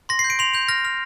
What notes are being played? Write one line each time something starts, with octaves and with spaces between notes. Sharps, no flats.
C6 A#6
C7
G6
D7
C6 F7
G6 F7
F6 A#6
F6